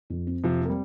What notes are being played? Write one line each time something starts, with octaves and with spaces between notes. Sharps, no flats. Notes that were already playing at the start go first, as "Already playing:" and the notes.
F2
C4
F2 C3 F3
A#3 C4
G3